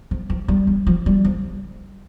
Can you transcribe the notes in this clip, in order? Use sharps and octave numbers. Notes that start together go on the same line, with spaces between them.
F3
F3
G3
G3
F3
G3
F3